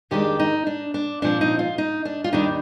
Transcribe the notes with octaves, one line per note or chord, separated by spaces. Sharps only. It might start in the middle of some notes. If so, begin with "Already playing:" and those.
F2 D#3 G#3 D4 G4
D#4
D4
D4
A#2 F3 C4 D4
D#4
F4
D#4
D4
F4
D#2 D#3 G3 D4 D#4